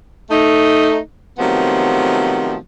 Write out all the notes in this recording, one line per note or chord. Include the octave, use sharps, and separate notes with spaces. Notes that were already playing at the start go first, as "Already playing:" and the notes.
A3 D#4
C3 D#3 F3 F#3 A3 B3